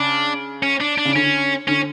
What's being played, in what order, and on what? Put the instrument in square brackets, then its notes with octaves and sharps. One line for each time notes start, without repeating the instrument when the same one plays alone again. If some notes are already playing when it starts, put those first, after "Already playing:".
Already playing: [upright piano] C#3 [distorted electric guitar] D4
[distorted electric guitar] C#4
D4
D4
[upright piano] C#3
[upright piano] D3 [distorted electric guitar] C#4
[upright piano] D3 [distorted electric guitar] C#4